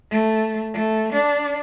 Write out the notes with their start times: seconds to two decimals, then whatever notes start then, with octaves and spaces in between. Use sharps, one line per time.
0.11 A3
0.74 A3
1.13 D4